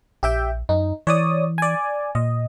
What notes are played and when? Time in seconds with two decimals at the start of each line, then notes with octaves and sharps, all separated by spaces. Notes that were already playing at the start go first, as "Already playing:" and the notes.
0.23 A#1 G4 E5 G5
0.69 F#2 D#4
1.07 E3 C#5 D5 D#6
1.58 D5 G#5
2.15 A#2 D#5